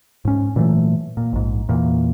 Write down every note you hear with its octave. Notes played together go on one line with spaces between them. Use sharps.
G#2 C#4
A#2 E3 F#3 A3
A#2
A#1 G#2
E2 A#2